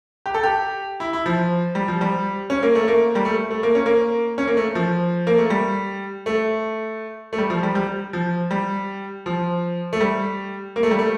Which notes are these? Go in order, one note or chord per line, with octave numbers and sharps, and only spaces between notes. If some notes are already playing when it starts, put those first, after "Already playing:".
G4
A4
G4
E4
E4
F3
G3
F3
G3
C#4
A#3
A3
A#3
G3
A3
A3
A#3
C#4
A#3
C#4
A#3
A3
F3
A#3
A3
G3
A3
A3
G3
F3
G3
G3
F3
G3
F3
A3
G3
A#3
A3
G3
A3